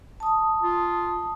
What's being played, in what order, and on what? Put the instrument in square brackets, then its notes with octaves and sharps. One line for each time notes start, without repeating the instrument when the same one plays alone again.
[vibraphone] A5 D#6
[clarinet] F4